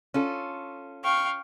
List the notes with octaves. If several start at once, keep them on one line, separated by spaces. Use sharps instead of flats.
C#4 F4 A4
F5 G5 C#6